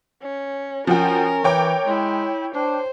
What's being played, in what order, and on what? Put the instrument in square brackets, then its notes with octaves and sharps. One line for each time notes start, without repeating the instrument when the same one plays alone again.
[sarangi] C#4
[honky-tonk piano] F3 F#4 G5 [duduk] C#4 [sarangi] A#4
[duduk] E3 [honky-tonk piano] C#5 G5 D6
[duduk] G#3 [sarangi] E4
[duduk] D4 [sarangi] C5